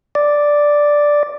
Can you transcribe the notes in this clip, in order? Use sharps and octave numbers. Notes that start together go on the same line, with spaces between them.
D5